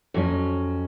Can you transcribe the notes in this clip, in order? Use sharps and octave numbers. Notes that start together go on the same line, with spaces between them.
F2 F#3 C#4